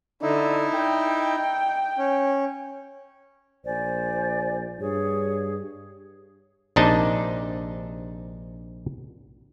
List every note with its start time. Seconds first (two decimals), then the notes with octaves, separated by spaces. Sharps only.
0.22 D3 D#4 E4
0.76 G5
1.98 C#4
3.65 A#1 C5 D5 G#5
4.80 G2 G#4 C#5
6.76 A#1 C3 D4 D#4 D#5 A5